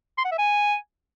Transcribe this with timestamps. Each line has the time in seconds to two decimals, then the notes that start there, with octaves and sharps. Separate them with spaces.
0.18 C6
0.25 F#5
0.32 E5
0.39 G#5